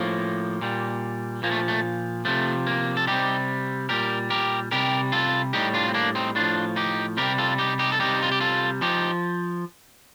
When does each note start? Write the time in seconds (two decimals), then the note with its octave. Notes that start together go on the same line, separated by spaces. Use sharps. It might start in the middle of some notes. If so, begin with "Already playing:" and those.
Already playing: A2 F3 A#3
0.61 A#2 G3
1.43 A#2 F3 A#3
1.51 A3
1.68 A3
2.25 C3 F3 A3
2.67 A#3
2.97 A4
3.07 C3 G3 D#4 G4
3.89 A#2 G3 G4 A#4
4.30 G4 A#4
4.71 C3 G3 G4 A#4
5.12 F4 A4
5.53 A2 G3 D#4 G4
5.74 D4 F4
5.88 C4
5.94 A#3 D4
6.15 C4 D#4
6.35 A2 F3 D4 F4
6.76 D#4 G4
7.17 C3 G3 G4 A#4
7.38 F4 A4
7.58 D#4 G4
7.79 D#4 G4
7.92 A4
7.99 C3 G3 D#4 G4
8.22 F4
8.32 G4
8.40 F4 A4
8.81 F3 D#4 G4